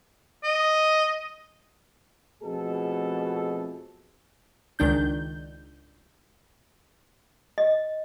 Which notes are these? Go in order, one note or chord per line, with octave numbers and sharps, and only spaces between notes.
D#5
F2 B2 A3 G#4 A4
C#2 D#3 D4 G6
D#5